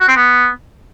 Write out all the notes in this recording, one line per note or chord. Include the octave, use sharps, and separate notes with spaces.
F#4
C4
B3